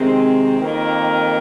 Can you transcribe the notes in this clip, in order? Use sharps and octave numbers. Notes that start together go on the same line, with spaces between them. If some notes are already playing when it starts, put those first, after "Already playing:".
Already playing: C3 D#3 G#3 C4
F2 D#3 A#3 D#4 A#4